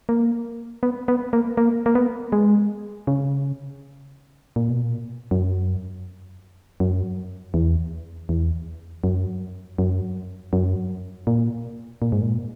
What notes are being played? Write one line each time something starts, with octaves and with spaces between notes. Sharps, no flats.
A#3
B3
B3
A#3
A#3
A#3
B3
G#3
C#3
A#2
B2
A#2
F#2
F#2
E2
E2
F#2
F#2
F#2
A#2
A#2
G#2
A#2